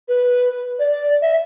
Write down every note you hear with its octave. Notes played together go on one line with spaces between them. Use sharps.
B4
D5
E5